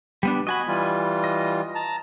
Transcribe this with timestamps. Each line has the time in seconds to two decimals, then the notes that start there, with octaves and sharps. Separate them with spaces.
0.23 G3 B3 D4
0.47 F#4 D#5 G#5 B5
0.68 E3 G3 F4
1.24 D#5
1.75 A5 A#5